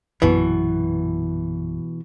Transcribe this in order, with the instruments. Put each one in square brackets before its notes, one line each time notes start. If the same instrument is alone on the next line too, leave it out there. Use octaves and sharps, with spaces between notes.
[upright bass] A#1 F#2 [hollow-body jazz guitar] B2 E3